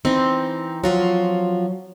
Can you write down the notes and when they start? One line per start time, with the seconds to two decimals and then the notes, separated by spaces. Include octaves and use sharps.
0.05 E3 C4 D#4
0.84 F3 F#3 F4 F#4